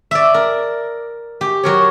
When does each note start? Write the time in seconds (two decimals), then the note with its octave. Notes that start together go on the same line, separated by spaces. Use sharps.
0.11 D5 E5
0.34 A#4
1.41 G4
1.63 F#3 A#4 C#5